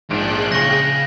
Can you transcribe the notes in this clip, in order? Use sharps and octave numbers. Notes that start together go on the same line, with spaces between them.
A#1 G#2 F3 D4 G#4 G5 F#6 D7
C#3 C#6 A#6